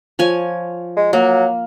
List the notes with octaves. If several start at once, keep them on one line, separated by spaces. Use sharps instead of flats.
F3 C#5 G#5
G#3
F#3 A#3